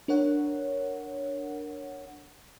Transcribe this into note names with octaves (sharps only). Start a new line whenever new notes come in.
D4 A#4 C#5 F#5